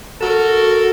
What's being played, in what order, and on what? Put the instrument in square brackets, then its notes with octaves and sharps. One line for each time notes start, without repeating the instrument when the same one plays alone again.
[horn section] F#4 A4 A#4